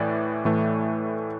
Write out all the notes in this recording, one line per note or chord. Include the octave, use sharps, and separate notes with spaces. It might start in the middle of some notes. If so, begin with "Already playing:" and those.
Already playing: A2 E3 A3 D5
A2 E3 A3